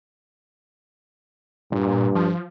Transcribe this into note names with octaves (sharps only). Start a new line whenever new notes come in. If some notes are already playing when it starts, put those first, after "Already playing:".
G2 A#2
F3